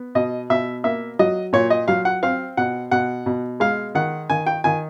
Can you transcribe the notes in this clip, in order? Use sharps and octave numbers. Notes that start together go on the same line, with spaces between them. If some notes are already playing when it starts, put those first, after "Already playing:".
Already playing: B3
B2 D#5
B2 E5
A#3 E5
F#3 D#5
A#2 C#5
D#5
F#3 F5
F#5
C4 F5
B2 F#5
B2 F#5
B2
G#3 F5
D#3 F#5
D#3 G#5
G5
D#3 G#5